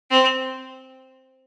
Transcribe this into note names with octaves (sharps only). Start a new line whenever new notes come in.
C4